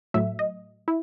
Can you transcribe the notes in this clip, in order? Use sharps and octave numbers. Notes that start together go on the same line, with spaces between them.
A2 F#3 A3 E5
D#5
E4